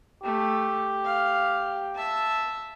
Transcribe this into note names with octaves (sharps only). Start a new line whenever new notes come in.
A3 G4
F5
E5 A5